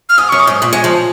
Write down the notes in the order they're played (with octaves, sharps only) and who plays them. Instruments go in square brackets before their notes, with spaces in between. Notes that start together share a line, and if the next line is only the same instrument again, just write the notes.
[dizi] F6
[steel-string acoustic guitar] G#2 [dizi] D#6
[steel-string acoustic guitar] F#2 [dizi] C#6
[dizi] D#6
[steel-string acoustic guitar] G#2
A#2
G#3
F3